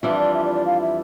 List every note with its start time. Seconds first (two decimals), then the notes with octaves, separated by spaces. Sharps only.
0.03 F2 E3 G3 D4 F4 E5
0.19 D5
0.34 E5
0.45 D5
0.55 D5
0.66 F5
0.81 E5